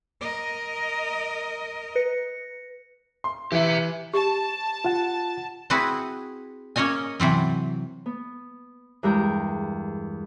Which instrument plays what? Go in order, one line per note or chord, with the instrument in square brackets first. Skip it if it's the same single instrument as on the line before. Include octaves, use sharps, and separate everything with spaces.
[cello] A#4 D#5
[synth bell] B4 A#6 C#7
[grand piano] C6
[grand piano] E3 [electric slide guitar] G4 E5
[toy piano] G4 [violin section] A5
[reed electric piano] F4 F#5
[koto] C4 E4 F#4 G#4 B4
A#3 C#4 C#5 D#5 G#5
C3 E3 F#3 C4
[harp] B3
E2 G2 G#3 A#4 G5